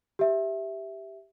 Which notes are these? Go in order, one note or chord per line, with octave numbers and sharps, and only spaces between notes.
G4 E5